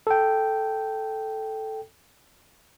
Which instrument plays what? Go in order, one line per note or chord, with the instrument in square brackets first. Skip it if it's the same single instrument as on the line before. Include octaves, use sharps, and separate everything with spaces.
[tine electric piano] A4 G5